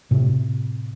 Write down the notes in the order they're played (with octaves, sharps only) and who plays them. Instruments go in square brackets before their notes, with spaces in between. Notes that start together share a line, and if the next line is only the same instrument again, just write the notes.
[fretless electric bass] A2 C3